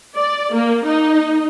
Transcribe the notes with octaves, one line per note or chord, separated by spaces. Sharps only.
D5
A#3
D#4